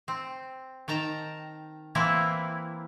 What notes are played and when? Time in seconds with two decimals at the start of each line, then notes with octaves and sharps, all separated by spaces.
0.08 C4
0.88 D#3 G5 A5 A#5
1.95 E3 A#3 C4 E4